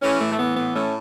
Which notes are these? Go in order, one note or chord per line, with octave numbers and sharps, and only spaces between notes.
E3 A3 C#4
A2 A3
A3
E3 B3
A2 B3
A2 A3 C#4